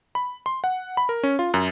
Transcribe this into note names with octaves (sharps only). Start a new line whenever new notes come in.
B5
C6
F#5
B5
A#4
C#4
F4
F#2